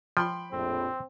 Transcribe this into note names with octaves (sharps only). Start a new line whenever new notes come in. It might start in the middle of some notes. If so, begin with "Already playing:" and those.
F3 G5 B5 C6
A#1 F2 A2 C4